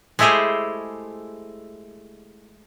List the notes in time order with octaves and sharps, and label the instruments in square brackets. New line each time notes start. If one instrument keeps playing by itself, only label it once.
[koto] G#3 A3 E4 G4 G#4 C5